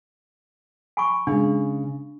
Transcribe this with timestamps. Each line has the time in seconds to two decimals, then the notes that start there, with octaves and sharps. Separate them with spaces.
0.97 G#5 B5 C#6
1.27 C#3 G#3 D4